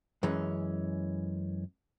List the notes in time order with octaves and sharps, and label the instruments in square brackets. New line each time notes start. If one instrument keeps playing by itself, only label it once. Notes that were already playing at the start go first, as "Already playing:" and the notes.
[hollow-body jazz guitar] F#2 E3 G#3 C#4